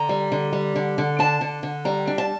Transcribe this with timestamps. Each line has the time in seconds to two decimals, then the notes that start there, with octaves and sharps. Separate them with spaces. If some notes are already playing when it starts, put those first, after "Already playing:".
Already playing: D3 A#5
0.09 G3
0.32 D3
0.53 G3
0.76 D3
0.98 D3
1.19 D4 A5
1.41 D3
1.63 D3
1.85 G3 A#5
2.07 D4
2.18 A5